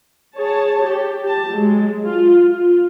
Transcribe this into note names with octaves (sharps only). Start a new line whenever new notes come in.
G#4 C#5 A5
G4
G4 A5
F#3 G#3
F4
F4